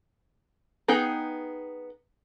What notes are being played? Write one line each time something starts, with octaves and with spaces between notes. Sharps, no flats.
B3 D#4 G#4 G5